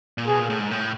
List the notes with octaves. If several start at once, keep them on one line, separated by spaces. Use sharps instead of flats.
A#2
B2 G#4
A#2
A2
G#2
A2